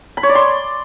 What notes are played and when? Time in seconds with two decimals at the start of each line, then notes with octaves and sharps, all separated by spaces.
0.17 B5
0.23 C#5
0.29 D5
0.35 C6